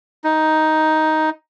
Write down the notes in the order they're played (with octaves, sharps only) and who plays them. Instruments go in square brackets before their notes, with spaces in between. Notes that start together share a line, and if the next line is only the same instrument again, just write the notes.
[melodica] D#4